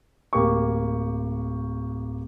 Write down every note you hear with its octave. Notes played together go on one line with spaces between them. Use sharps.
D1 A#3 G4 C#6